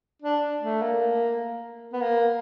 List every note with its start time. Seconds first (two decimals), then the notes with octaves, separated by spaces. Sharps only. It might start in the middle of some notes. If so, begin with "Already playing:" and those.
0.22 D4
0.62 A3
0.82 A#3
1.93 B3
2.01 A#3